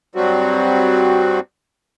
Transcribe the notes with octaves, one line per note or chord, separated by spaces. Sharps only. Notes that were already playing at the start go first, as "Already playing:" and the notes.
G2 F#3 G3 C4 F#4